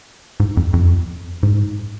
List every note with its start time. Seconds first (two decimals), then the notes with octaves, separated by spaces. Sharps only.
0.40 G#2
0.57 F2
0.73 F2
1.43 G#2